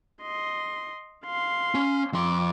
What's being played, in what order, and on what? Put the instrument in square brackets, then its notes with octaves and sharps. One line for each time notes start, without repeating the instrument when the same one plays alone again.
[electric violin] D#5 C6
F5 C6
[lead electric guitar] C#4
[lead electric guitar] F2 C6 [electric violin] F4 D6